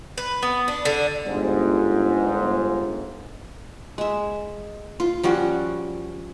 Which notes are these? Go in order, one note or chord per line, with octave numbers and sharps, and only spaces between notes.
B4
B3
D4
D3
G1 G#2
G#3 E5
F4
F3 G3 C#4 F#4